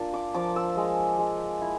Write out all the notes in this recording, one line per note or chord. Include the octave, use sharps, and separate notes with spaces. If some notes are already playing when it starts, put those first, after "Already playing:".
Already playing: A#3 D4 F4
D6
F3 D6
E6
G#3
G#3
E4